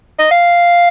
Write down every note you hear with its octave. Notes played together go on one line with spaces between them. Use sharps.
D#5
F5